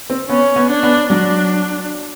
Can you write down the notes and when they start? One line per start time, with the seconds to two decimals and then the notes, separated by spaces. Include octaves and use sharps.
0.10 C4
0.29 B3 C#4
0.56 B3
0.70 D4
0.83 B3
1.10 F#3 D4